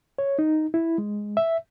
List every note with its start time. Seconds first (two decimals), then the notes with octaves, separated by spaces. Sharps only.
0.18 C#5
0.39 D#4
0.74 E4
0.98 G#3
1.37 E5